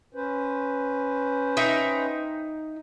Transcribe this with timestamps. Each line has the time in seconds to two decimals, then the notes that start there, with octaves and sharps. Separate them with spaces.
0.14 C#4 B4 C5
1.57 D#4 E5 G5